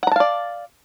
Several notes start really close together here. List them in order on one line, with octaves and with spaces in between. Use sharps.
F#5 A#5 A5 F5 D5